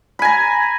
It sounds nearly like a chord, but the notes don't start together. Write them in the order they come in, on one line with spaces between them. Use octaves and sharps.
B5 G#5 A#5